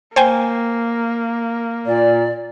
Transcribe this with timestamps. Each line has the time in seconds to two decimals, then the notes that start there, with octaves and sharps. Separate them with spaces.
0.16 A#3 C5 G5 G#5
1.86 A#2 D5